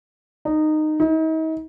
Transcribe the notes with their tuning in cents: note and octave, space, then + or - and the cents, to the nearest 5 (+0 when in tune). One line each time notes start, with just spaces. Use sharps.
D#4 -15
D#4 +40